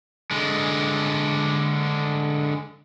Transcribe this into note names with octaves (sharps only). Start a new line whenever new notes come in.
D3 G#3